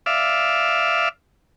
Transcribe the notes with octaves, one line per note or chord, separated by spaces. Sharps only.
D5 E5 F5